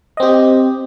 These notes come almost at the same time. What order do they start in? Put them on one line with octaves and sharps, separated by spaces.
D#5 C4 G4